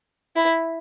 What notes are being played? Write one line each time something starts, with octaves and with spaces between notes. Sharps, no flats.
E4